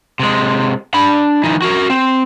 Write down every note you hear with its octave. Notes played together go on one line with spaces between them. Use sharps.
C3 G#3
D4 B5
E3 D#4
F#4 A#4
C4